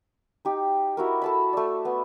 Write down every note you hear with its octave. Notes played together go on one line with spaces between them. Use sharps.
D#4 G4
E4 F#4 A#4
A4 A5 B5
A3 D5
B3